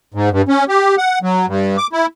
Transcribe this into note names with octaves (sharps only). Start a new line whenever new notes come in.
G#2
G2
C#4
G4
F#5
F#3
G2
D6
E4